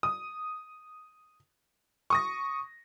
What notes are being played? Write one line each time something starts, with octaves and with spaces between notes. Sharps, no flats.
D#6
C#6 D#6 A#6